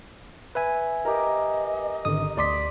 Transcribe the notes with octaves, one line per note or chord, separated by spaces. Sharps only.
B4 E5 G#5
G4 A#4 D#5
G#1 D3 D#6
D2 D5 C6 D#6 B6